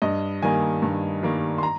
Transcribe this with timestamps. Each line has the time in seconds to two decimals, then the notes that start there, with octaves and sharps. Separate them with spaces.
0.02 G2 D#5
0.43 D#3 G3 A#3 G#5
0.82 G2
1.23 D#3 G3 A#3
1.58 C6
1.63 A#5